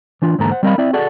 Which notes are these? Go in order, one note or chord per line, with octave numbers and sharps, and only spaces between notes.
E3 D4 F4
E2 G#2 D3 A#3 A4 A#5
C5 F#5
G3 C4 A#4 D#5 F5 B5
C4 E4 D5 E5
F#4 G#4 A4 D5 F#5